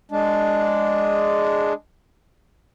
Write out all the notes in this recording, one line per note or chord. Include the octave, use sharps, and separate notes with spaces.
G#3 D4